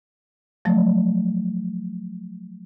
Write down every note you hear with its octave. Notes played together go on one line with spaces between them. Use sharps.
F3 F#3 A3